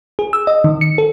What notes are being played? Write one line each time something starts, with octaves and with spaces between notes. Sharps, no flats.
G#4
E6
D#5
D#3
C#7
A4